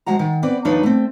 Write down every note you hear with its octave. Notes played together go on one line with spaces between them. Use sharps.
F3 G#3 F#4 F#5 A#5
D#3
B3 C4 B4 D5
D#2 F3 D4 D#4 B4 C#5
A3 C4